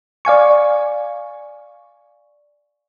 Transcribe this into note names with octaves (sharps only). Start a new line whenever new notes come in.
D5 F5 G#5 C#6